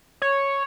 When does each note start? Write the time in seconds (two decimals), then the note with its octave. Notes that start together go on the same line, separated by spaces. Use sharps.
0.22 C#5